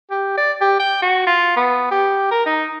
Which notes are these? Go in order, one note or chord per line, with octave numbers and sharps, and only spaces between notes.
G4
D5
G4
G5
F#4
F4
B3
G4
A#4
D#4